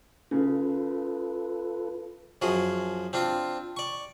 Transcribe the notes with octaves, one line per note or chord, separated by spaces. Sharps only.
C#3 F4 A4 B4
F#2 F3 F#4 G#4
C4 D4 F4
D5 C#6